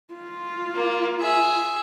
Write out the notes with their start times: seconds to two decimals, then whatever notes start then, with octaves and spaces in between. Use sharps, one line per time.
0.14 F4
0.75 A#3
1.21 G#4 E5